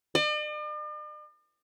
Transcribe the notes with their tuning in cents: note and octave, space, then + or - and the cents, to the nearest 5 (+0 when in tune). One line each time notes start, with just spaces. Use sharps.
D5 +45